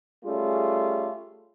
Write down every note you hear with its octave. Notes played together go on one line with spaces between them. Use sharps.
G3 A3 C#4 F4 G#4